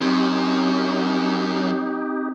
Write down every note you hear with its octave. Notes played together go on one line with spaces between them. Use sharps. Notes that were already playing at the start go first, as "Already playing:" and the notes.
F#2 C4 D#4 G4